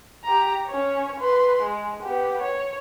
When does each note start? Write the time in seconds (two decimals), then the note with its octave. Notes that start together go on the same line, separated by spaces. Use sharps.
0.24 G4 A#5
0.68 C#4 C#5
1.20 B4 C6
1.62 G#3
2.02 B3 G4
2.42 C#5